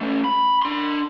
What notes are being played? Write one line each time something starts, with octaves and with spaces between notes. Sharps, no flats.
A3 C#4
B5
D4 C6